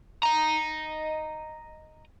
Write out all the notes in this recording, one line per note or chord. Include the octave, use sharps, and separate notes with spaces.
D#5 A#5